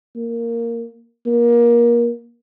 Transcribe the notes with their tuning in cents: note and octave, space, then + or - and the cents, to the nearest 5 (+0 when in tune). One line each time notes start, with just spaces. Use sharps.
A#3 -5
A#3 +25